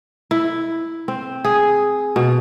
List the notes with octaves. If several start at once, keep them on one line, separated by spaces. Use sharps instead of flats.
E4
C4
G#4
B2